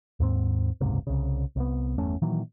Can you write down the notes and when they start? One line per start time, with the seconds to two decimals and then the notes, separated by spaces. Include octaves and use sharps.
0.20 D#2 G#2 C4
0.81 F#1 C#2 G#2 C3
1.07 C2 C#3
1.56 C2 B3
1.98 G1 E2 A3 C#4
2.22 A#2 D#3 E3 F#3